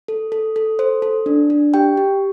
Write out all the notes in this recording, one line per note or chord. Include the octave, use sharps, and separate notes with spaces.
A4
A4
A4
A4 C5
A4
D4
D4
G4 G5
G4